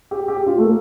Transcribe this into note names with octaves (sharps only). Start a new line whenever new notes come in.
G4
G4
F4
A3
A#3